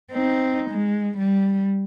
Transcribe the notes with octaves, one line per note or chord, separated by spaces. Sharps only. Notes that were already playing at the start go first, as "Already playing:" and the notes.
C4 D#4
G#3
G3